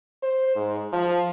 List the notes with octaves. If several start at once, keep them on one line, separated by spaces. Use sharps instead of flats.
C5
G#2
F3